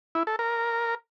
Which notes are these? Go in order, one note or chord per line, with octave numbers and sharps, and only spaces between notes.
E4
A4
A#4